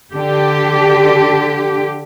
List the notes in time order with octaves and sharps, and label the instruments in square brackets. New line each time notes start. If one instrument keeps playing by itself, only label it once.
[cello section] D3 G4